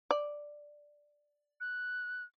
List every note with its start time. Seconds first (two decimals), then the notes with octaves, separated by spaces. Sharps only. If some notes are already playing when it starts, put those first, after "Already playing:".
0.11 D5
1.61 F#6